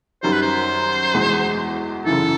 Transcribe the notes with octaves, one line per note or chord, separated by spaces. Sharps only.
F#2 D#3 G3 C5
B4
C5
E2 B2 G#3
F#2 C#3 E3 A4